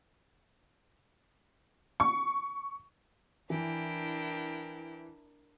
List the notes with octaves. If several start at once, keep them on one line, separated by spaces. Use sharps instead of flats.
C#6
E3 D4 E4 A#4 G5